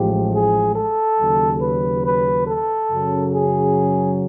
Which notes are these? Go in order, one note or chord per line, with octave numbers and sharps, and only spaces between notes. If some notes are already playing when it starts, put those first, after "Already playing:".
Already playing: A1 A2 F3 G#3 G4
G#4
A4
D#2 C#3 F#3
B4
B4
A4
F#2 C#3 F#3
G#4